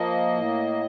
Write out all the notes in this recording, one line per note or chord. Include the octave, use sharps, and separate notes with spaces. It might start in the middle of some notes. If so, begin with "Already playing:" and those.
Already playing: F3 A#3 D#5
A2